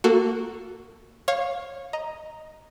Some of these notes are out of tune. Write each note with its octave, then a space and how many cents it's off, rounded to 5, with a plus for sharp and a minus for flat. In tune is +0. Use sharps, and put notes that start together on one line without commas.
A#3 -15 F#4 +0 A4 +0
C#5 -20 F5 +10
D#5 +0 A#5 +0